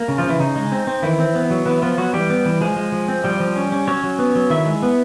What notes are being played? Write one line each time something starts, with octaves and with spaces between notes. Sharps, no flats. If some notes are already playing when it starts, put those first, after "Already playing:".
Already playing: A#3
C#3
F3 F4
C#3
E3 E4
C#3 D#4
G#3
C4
C4
D#3 E3 E4
C4
B3
F#3
E3 B3 E4
F3 B3 F4
F#3 B3 F#4
E3 G3 G4
B3
E3
F3 G#3 G#4
G#3
F3
C4
F3 G3 G4
F3
C#4
C#4
F#3 C#4 C#5
F#3
B3
F#3
D#3 E4 E5
G#3
B3